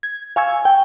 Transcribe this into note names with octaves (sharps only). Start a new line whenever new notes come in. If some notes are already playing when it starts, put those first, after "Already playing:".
G#6
F5 G#5 C#6 E6 G#6
G5